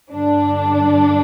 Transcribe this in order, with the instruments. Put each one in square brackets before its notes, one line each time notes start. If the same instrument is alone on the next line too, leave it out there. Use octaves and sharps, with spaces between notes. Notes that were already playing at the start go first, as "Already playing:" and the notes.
[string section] G2 D3 D4